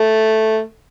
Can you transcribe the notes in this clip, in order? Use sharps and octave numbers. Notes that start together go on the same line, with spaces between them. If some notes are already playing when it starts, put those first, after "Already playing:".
Already playing: A3